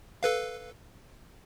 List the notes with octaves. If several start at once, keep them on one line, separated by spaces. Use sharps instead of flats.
A4 B4 F5